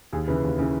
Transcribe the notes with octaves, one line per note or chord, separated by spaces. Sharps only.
D#2 G#4
C#3 E3 B4
D#2
C#3 E3